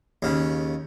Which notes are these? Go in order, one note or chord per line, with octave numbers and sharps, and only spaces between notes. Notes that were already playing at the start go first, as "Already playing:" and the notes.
D#2 C#3